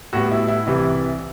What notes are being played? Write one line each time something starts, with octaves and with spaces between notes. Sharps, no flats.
A2 G3 B3 F#4
E4
E4
C2 C3 E3 G3